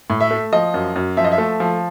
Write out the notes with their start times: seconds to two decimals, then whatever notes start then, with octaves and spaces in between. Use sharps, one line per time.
0.10 A2
0.21 E5
0.31 A3
0.53 F3 D#5
0.74 F#2
0.96 F#2
1.17 F3 E5
1.25 D#5
1.32 E5
1.38 A3
1.60 F3